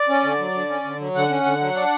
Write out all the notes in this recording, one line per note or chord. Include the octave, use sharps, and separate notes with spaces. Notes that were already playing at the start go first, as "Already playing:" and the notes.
Already playing: D5
C#4
D3
F#3
D3
C#4
D3
F#3
D3 F#5
C#4
D3
F#3
D4